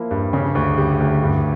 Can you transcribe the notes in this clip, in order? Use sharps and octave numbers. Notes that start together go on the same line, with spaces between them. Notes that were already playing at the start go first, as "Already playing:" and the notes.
Already playing: F3 A#3 E4
G2
C#3
D2
G3
D2
G2